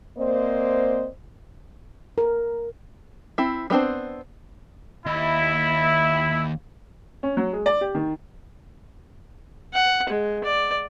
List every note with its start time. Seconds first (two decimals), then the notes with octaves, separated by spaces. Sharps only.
0.18 A#3 C4 C5 D5 D#5
2.18 A#4
3.38 C4 E4
3.70 G3 B3 C4 D4 C5
5.06 D#2 E4 D#5
7.23 C#4
7.37 F#3
7.53 G#3
7.66 D5
7.81 G4
7.95 D#3
9.74 F#5
10.09 G#3
10.44 D5